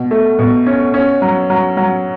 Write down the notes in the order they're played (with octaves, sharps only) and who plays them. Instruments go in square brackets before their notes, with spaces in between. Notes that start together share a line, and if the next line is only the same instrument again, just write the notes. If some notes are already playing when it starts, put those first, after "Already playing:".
Already playing: [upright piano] B2
A3
B2
C#4
C#4
F#3
F#3
F#3